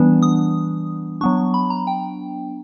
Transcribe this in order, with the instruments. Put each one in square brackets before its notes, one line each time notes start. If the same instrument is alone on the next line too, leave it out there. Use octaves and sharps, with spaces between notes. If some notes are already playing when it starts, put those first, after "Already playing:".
Already playing: [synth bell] E3 G3 B3 D4
D#6
F#3 B3 D4 C#6
B5
A#5
G5